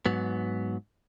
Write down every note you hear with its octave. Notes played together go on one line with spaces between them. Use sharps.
G#2 F#3 B3